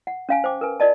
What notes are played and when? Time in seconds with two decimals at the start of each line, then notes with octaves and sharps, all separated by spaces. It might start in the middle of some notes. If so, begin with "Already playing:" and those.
0.07 F#5
0.29 C#4 F5 G#5
0.44 C5 G5 D6
0.61 A#4 B4 G#5
0.80 F4 A#4 D5 D#5 A5